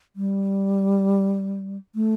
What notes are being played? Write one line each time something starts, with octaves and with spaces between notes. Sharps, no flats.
G3
A3